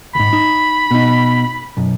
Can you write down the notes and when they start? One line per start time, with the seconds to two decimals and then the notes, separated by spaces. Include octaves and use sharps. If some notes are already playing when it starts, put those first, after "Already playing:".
0.15 D2 G#2 B5
0.33 D#4
0.91 B2 D#4
1.77 B1 F#2